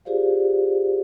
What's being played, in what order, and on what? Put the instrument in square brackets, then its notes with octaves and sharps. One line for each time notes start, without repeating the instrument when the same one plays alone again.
[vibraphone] F4 G4 G#4 C5 D5 F5